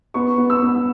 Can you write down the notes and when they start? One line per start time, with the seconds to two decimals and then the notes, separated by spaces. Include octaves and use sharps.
0.14 B3 C#6
0.38 B3
0.50 E6
0.62 B3